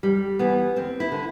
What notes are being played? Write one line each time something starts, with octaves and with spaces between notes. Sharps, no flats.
F2 G3
E3 B3
D2 C4
E4
D3